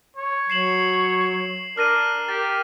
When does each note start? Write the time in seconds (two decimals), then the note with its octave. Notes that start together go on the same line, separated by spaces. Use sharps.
0.17 C#5
0.50 F#3 C7 E7 F#7
1.77 D4 A#4 F6 A#6 D#7
2.28 G4 A6